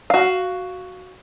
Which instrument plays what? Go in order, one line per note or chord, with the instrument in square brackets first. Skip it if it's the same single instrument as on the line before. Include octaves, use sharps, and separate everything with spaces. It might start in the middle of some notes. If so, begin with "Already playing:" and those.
[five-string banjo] F#4 F5